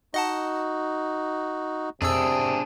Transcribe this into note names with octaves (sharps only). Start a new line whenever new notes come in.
D#4 F#4 D#5 F#5 A5
F2 C3 D4 G#4 E6